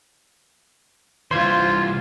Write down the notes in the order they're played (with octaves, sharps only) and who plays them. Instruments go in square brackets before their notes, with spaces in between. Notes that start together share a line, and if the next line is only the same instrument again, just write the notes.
[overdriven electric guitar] C2 E3 [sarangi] F4 [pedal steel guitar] C5 [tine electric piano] C6 G#6